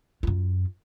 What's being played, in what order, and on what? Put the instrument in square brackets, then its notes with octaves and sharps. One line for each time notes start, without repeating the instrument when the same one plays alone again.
[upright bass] F#2 F4